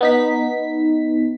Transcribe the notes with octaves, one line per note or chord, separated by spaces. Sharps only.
B3 D#4 B6